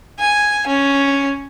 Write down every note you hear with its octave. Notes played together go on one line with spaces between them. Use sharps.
G#5
C#4